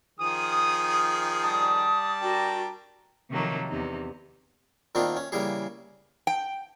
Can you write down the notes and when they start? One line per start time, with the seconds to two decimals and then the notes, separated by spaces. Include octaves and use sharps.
0.20 D#3 F3 G#4 D#6
1.43 G3 D5 A5 D#6
2.21 D4 F#4 A#4 G5
3.30 C3 D#3 F3 F#3 A3 A#3
3.68 E2 C3 D#4
4.95 A#2 D#3 B3 C4 D4 F4
5.17 C#4
5.32 C#3 E3 G3 A#3 G#4
6.27 G5